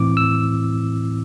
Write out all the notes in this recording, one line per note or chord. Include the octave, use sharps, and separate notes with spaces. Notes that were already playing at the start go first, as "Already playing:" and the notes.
Already playing: A2 E3 C4 E4 D6
E6